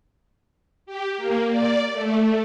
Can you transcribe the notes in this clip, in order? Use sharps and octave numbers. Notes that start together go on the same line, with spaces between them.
G4
A#3
D5
A3